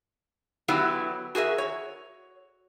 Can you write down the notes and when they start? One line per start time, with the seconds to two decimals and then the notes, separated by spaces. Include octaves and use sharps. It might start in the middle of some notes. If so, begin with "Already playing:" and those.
0.68 D3 F#3 B3 E4 F#4 G4
1.35 F#4 G#4 A#4 E5
1.58 C#5